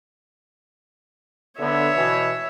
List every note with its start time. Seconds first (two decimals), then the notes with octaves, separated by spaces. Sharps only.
1.60 D3 B3 C#5 E5
1.96 B2 E3